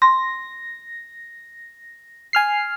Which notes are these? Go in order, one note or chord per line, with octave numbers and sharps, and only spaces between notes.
C6 A#6
G#5 F6 C7